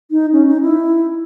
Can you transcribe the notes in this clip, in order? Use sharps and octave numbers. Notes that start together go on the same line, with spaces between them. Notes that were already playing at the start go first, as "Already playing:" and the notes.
D#4
C#4
D#4
E4